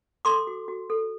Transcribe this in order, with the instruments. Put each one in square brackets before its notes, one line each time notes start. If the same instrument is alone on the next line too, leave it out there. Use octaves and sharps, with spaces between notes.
[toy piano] A4 C6 D6
F#4
F#4
A4